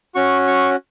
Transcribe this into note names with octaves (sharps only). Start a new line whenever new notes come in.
C#4 F#4 C#6
C#6